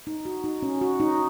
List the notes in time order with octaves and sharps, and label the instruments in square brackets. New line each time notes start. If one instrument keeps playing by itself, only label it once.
[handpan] D#4
F#4
D#4
C#4
F#4
D#4